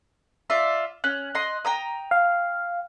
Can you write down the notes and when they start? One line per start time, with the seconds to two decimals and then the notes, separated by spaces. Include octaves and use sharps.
0.50 F4 D5 E5
1.04 C#4 F#6
1.35 D#5 C6
1.65 G5 A#5 D#6
2.11 F5